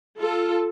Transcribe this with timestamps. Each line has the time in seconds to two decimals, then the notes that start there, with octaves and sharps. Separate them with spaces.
0.19 F4 A4